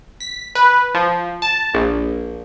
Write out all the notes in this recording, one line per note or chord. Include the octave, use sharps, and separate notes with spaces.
B6
B4
F3
A5
A#1